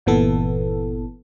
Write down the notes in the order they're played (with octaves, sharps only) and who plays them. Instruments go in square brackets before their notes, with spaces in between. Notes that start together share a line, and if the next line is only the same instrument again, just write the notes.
[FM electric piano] G1 A#2 E3 B3 A4